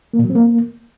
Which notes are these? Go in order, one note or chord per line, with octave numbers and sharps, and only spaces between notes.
A#3
A#2
F#3
C4
A#3